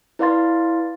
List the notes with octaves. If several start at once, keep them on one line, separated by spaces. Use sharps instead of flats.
E4 B4 D5 F5 C6 A6